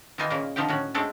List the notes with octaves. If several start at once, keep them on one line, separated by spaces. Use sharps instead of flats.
D#3 E3 D#4 F4 G#5
A#2 C#3 A#3
D3 D#3 F3 D#4 G4 G5
A2 C#4 F#4
G#3 A3 C4 D4 A4